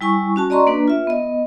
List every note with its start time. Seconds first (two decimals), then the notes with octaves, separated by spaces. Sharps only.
0.01 G3 E4 G#5 C#6
0.36 C#4 F#4 A5
0.50 D5 D#5 A#5 C6 C#6
0.67 A#3 D4 B4
0.88 F4 E5
1.07 B3 D#5